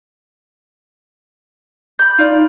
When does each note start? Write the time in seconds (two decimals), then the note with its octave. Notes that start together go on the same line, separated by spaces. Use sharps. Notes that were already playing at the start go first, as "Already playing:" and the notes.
1.99 B5 G6
2.18 D#4 F4 D5